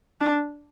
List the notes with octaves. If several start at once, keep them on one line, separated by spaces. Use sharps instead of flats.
D4